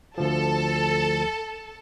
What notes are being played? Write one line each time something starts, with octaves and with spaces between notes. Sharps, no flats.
D2 F3 A4 A5